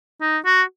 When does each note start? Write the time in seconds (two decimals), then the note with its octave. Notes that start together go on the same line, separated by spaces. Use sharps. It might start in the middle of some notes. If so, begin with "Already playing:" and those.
0.21 D#4
0.45 F#4